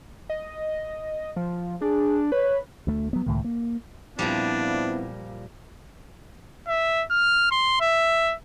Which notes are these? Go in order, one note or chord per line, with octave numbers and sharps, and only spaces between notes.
D#5
F3
D4 G#4
B4 C#5
D2 A3
F#3 B3
C#2 A2 D#3
A#3
A#2 F3 G3 B3 C4 D4 E4
E5
F6
C6
E5